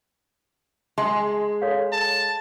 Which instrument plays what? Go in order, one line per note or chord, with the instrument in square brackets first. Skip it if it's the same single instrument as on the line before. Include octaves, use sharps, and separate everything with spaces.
[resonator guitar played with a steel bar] G#3 [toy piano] A5 C6
[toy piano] A4 C#5 F5
[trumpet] A5